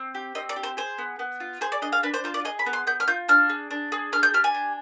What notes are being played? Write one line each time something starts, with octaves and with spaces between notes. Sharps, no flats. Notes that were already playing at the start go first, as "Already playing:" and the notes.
Already playing: C4
G4
C4 D#5
D5
G4
C5
G#4 C5
B3
B3
F4
G#4 C5
D5
D4 D#5
F5
D4 B4
C5
F4 C5
D5
G#4 D#5
B5
B3
C6
B3 G6
F6
F4 G6
D4 F6
G#4
D4
G#4
D4 F6
G6
G4 F6
G#5
D4